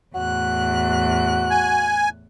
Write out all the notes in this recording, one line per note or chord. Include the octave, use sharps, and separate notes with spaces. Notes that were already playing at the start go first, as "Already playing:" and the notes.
E2 A2 F#4 F#6
G#5